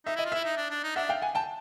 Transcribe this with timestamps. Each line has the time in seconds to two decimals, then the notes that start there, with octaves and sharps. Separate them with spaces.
0.06 D#4 E5
0.16 E4 D#5
0.25 F4
0.32 E4 E5
0.45 D#4
0.57 D4
0.71 D4
0.84 D#4
0.96 D4 E5 F#5
1.09 F5 G5
1.22 F#5 G#5
1.35 G5 A5